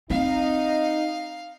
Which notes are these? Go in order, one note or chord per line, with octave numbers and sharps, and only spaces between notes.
C4 D#4 F5